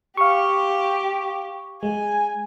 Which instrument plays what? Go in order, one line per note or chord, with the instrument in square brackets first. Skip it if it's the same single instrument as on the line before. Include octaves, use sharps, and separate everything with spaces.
[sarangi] G4 [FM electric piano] F5 C#6
[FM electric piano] G#3 [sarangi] G#5